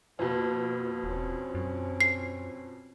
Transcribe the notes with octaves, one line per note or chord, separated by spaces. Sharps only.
F2 B2 A#3
D#1 C4 C#4
F#2
C7